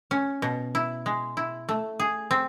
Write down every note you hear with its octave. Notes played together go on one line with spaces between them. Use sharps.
C#4
B2
E4
G#3
E4
A3
G#4
C4